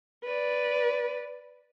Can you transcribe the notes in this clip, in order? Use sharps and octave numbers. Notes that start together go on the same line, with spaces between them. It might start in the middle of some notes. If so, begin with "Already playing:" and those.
B4 D5